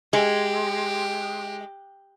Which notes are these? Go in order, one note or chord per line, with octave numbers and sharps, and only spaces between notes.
G#3 G4